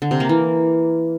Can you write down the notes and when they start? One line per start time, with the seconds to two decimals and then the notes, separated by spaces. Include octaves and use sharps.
0.02 D3
0.11 C3
0.20 A#3
0.29 E3